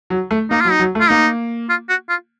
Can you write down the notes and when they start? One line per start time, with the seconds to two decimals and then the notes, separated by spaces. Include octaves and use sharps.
0.10 F#3
0.31 A3
0.50 A#3 D#4
0.61 F#3 F4
0.71 D#4
0.80 F#3
0.95 A3
1.01 F4
1.10 A#3 D#4
1.70 F4
1.89 F#4
2.09 F4